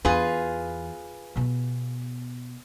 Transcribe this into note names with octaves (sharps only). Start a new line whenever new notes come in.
E2 F4 G#4 B4
B2 B3